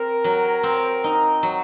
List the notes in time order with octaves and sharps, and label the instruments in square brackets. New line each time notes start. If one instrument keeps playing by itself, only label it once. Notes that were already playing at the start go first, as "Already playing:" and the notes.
Already playing: [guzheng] C4 [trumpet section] A#4
[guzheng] F#3
C4
D#4
F#3